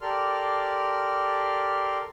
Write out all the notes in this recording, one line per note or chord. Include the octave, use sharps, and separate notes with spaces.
G4 A4 A#4 D5 C6 F6